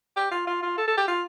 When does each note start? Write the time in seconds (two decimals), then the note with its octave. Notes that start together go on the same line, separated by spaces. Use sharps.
0.16 G4
0.31 F4
0.47 F4
0.62 F4
0.77 A4
0.88 A4
0.97 G4
1.08 F4